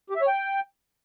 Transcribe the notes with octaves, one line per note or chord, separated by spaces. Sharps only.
G4
E5
C#5
G5